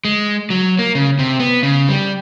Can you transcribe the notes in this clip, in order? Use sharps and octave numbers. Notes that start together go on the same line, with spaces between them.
G#3
F#3
A#3
C#3
C3
B3
C#3
G3